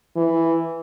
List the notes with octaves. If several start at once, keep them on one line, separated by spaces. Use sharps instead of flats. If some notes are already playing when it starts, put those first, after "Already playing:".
E3